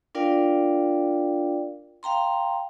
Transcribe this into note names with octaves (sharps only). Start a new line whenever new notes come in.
D4 F4 A#4 D5 F5 G5
F5 G5 A#5 C6